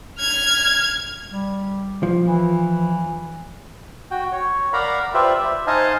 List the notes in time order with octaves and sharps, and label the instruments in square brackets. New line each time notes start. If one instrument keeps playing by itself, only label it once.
[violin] F6 G#6
[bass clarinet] G3
[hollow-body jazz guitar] F3
[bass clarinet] E3
[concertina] F#4 G5
C#5
A#4 D5 F5 F#5 A#5 B5
F4 G4 B4 C5 D5 E5
E5
D#4 C5 D#5 F5 G#5 A5